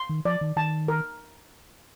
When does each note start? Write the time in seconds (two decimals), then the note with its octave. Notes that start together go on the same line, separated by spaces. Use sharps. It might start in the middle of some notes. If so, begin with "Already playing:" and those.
Already playing: C6
0.09 D#3
0.25 F3 D5
0.41 D#3
0.56 D#3 A5
0.88 A#4